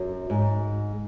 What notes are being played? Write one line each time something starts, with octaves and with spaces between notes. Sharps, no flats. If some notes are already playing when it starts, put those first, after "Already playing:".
Already playing: F#2
G#2